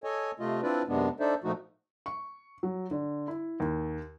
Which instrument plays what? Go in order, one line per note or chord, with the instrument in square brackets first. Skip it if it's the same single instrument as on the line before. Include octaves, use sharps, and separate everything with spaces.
[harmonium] A4 C#5 D#5 G#5
C3 A3 F4 D#5
C4 D4 E4 F4 B4 D5
F#2 C3 G#3 B3 D4
D4 D#4 A4 C5 D5 E5
A#2 F3 A3 D#4 F#4
[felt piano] C#6
F#3
D3
E4
D#2